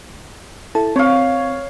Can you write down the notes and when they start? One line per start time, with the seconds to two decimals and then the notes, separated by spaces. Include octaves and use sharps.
0.75 E4 A4 A5
0.96 C4 C#5 F5